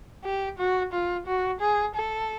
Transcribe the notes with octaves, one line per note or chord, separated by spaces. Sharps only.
G4
F#4
F4
F#4
G#4
A4